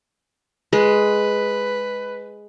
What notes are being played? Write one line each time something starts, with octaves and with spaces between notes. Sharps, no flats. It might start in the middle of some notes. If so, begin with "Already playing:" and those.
G#3 B4